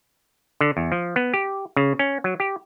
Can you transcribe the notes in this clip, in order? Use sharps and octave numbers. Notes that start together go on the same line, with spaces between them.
D3
E2
F3
B3
G4
C#3
C#4
F#3
G4